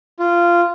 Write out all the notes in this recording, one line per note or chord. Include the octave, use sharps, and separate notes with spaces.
F4